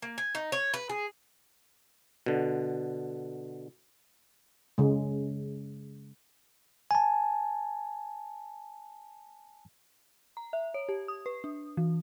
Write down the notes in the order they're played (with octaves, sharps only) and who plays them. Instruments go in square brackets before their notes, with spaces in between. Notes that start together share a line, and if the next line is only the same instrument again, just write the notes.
[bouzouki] A#3
G#5
D#4
C#5
B4
G#4
[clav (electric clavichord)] B2 D3
[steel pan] C#3 G#3
[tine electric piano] G#5 A5
[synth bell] A#5
E5
C#5
G4
D#6
B4
D4
E3